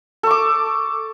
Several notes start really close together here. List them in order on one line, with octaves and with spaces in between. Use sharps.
A4 C#6 D6